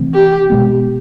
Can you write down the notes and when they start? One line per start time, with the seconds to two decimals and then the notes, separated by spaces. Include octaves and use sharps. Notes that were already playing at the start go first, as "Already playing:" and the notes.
Already playing: C3 E3 A3 C4
0.14 G4
0.50 B2 G#3 B3